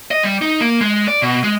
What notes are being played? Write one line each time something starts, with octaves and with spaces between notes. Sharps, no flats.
D#5
G3
D#4
A#3
G#3
D5
B2
G#3